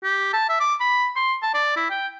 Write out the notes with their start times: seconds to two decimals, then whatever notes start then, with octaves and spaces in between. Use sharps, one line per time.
0.03 G4
0.33 A5
0.49 E5
0.60 D6
0.81 B5
1.16 C6
1.43 A5
1.54 D5
1.76 E4
1.90 G5